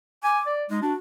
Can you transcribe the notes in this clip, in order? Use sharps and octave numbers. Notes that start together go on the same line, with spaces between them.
G#5 D6
D5
G#3 D#4
D4 F#4